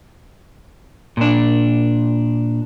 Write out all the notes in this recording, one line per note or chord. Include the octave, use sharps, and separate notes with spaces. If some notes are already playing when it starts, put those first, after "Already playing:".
A#2 D4